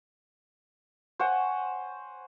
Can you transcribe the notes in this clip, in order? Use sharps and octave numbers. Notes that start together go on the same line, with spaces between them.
C5 C#5 F#5 G#5